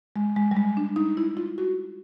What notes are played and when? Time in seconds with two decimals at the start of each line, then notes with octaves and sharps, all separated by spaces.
0.16 G#3
0.36 G#3
0.51 G3
0.57 G#3
0.77 D4
0.96 D#4
1.17 E4
1.37 F4
1.58 F#4